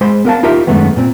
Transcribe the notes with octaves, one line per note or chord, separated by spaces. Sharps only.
G#3 C5 B5 C6
B3 A#4 F5 A5
D#4 F4 G4 A#4 E5
F#2 D3 D#3 G#3 A3 B3
A#2 C4